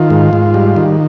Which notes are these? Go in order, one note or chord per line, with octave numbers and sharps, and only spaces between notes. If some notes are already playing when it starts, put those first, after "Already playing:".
Already playing: D#3 F4
G#2
G#2
G3
D#3